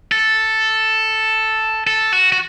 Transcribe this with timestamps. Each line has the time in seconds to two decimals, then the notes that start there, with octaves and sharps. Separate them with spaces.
0.12 A4
1.87 A4
2.12 F#4
2.32 F#4